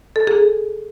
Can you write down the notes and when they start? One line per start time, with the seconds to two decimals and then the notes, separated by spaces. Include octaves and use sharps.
0.16 A4
0.27 G#4